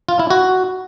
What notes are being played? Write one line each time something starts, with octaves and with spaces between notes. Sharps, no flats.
F4
E4
F#4